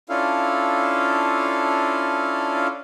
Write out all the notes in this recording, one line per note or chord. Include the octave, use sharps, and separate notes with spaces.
C#4 D4 E4 F4 A4 F5